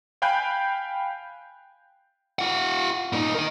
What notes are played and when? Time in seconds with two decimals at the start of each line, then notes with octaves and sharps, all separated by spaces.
0.22 F5 G5 G#5 B5 F#6 G6
2.39 F4 F#5
3.13 A#2 D#4
3.34 A#4 D#5